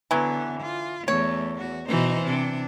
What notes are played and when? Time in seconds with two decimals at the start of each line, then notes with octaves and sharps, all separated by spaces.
0.11 D3 E3 F#3 B3
0.61 F4
1.08 E2 A3 C#5
1.54 E3 F#4
1.88 B2 E3 D#4 C5
2.25 C3 D4